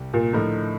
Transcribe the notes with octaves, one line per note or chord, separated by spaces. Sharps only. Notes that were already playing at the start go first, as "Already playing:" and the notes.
Already playing: C2 C3 G3
A#2
A2 D3 F3 A3 D#4 A#4